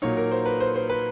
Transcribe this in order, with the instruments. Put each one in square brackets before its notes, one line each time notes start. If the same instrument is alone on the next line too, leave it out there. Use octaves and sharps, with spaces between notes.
[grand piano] A#2 F#3 A#3 D#4 C#5
A#4
C5
B4
C5
C5
B4